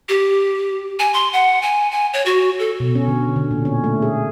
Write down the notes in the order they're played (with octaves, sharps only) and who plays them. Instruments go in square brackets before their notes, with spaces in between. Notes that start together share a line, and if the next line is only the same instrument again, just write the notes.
[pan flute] G4
G#5
C6
F#5
G#5
G#5
C#5
F#4
A4
[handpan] B2
C#4
D3
D3
A#2
C#4
A3
G#4